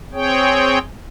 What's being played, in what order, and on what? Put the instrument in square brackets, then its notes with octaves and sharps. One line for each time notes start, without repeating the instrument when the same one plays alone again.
[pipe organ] C4 G#4 C#5 G5